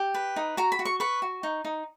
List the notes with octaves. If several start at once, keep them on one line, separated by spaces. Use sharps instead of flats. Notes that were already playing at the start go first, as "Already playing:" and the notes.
Already playing: G4
B4
D#4
F#4 A#5
B5
F#4
C#6
B4 C#6
F#4
D#4
D#4